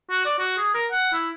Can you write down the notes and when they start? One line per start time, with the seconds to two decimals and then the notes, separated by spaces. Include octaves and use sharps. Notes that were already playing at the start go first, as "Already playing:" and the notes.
0.10 F#4
0.26 D5
0.38 F#4
0.58 G#4
0.74 A#4
0.91 F#5
1.13 E4